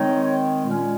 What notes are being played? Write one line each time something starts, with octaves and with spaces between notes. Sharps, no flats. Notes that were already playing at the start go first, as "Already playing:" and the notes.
Already playing: D#3 G#3 C4 D#4 C#5
A#2 G#3 C#4